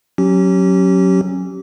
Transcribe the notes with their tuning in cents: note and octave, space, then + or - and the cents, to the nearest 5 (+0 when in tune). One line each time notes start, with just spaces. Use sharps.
F#3 -5 C#4 -15 G4 -25